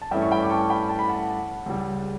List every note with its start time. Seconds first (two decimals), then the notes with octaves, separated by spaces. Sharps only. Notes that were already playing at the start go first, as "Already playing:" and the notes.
0.02 A5
0.11 G2 E3 A3 C#4 E5 G5
0.22 C#6
0.31 G5 B5
0.43 D6
0.50 A5 C#6
0.70 G5 B5
0.89 A5
0.99 B5
1.08 F#5 A5
1.66 C#2 C#3 G3